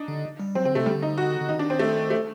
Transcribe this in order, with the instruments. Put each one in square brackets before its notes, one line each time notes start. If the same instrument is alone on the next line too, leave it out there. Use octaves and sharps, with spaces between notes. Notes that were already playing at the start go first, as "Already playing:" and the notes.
Already playing: [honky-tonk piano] D4 D#4
[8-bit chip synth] D3
G3
[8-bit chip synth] F#3 [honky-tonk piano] C4
[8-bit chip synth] D3 [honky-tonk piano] C4
[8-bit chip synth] C3 [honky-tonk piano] A3
[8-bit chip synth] D3 [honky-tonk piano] G3
[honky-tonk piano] D#4
F#4
[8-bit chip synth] D3
[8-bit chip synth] D#3 [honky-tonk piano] D#4
[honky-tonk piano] D4
C4
A3
A3